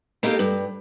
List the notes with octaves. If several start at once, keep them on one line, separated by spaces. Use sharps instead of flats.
A#3 D#4 E4 G4 A4
G2